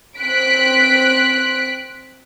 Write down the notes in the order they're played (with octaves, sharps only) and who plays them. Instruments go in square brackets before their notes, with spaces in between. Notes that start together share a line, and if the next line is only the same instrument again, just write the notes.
[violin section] C4 F#6 B6 D7